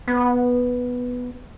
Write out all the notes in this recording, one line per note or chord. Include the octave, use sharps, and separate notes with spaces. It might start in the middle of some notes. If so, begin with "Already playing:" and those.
B3